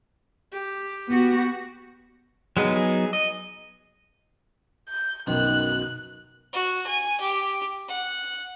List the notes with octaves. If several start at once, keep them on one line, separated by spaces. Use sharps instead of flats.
G4
B3 F#4
F#3 G#3 B3 D#4
G#4
D#5
G6
B1 F#2 D#3 F#6
F#4
G#5
G4
F#5